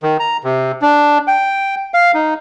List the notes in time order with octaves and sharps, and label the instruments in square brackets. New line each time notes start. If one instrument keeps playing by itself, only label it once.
[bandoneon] D#3
A#5
C3
D4
G5
F5
D#4